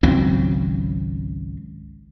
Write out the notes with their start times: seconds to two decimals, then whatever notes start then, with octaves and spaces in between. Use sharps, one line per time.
0.03 G#1 C#2 F#3 C4